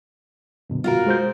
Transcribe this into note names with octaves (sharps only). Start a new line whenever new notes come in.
F#2 B2 D3
F4 F#4 A#4
G#3 C5 G6